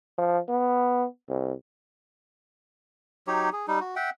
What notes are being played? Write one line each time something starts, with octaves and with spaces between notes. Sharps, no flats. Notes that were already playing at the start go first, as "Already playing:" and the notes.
F3
B3
C2
F#3 D#4 G4 C#5
G#4
G3 D#4
F#4
E5 F#5 G5